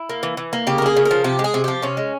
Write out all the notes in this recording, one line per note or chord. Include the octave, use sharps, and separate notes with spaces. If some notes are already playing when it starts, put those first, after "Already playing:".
Already playing: E4
A#3
E3
E3
A#3
C#3 G4
A#4
A#3 G#4
C#3
A#4
F3
C3 G4
G#3
G#4
C3
F3 G4
C3 C#4
G#3